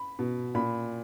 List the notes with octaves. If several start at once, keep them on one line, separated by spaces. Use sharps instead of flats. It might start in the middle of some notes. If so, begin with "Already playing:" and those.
Already playing: B5
B2
A#2 B5